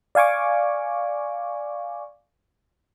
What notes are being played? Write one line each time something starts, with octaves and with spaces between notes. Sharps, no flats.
D5 F5 G#5 C#6 D6